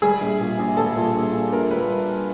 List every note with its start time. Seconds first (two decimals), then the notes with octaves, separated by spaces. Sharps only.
0.02 G3 G#4
0.21 A#1
0.40 A#2
0.59 A#1
0.77 G3 A4
0.96 A#2
1.14 A#1
1.33 A#1
1.52 A#1 A#4
1.70 G3 B4